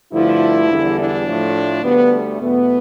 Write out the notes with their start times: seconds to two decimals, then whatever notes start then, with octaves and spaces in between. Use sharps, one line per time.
0.12 G2 D3 F3 A3 E4
0.70 E2 D3 G3
0.98 D4
1.26 A2 F3 A3
1.83 D2 D3 G3 B3
2.13 A3
2.40 E2 B2 A3 B3